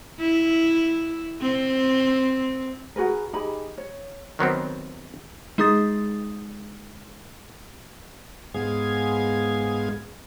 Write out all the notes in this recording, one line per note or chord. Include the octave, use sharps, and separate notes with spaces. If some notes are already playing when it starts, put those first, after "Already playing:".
E4
C4
F#4 G#4 A#4 B4
D#4 G4 G#4 B5
C#5
D#3 F#3 B3 C4
G#3 D#4 G#4 D#6 A6
G#2 G#3 B3 G#4 F5 G#6